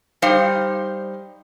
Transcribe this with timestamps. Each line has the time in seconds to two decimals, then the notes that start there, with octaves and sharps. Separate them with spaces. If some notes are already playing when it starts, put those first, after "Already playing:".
0.22 G3 D#4 C5 F5